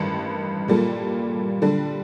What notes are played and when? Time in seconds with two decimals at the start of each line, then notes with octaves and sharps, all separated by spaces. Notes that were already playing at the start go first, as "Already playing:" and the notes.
Already playing: A1 G2 D#3
0.68 A#2 G3 A#3 F4 A4
1.62 D3 G3 D4